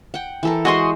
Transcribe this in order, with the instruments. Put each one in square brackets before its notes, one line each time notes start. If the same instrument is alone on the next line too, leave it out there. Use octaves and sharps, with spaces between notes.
[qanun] F#5 G5
E3 A4 A#4
[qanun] G#3 C5 [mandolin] F#4 D#5 C6